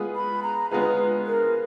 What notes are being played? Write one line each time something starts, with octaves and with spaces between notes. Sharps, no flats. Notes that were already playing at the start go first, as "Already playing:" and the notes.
Already playing: G#3 B3 F4 G#4 B4
B5
A#5
G#3 B3 F4 G#4 B4 A#5
A#4